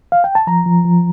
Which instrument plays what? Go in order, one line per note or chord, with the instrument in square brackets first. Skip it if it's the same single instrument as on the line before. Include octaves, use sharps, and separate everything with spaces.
[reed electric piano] F5
G5
A5
F3 A#5
F3
F3